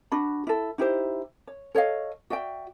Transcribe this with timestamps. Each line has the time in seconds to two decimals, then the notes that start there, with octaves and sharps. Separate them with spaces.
0.12 D4 F#4 B5
0.47 E4 A4
0.78 D#4 E4 G4 C5
1.47 C#5
1.75 A4 C#5 D#5 F5
2.30 F#4 D5 E5 G5